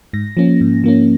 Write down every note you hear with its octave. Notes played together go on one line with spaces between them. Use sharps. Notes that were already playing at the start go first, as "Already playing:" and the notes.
G#2 A#6
F3 A#3 C#4
G#2
F3 A#3 C#4